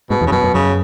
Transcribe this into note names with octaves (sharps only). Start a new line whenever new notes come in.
G#2 B2
E2
C#3
F#2 B2
F#2
F#2 C#3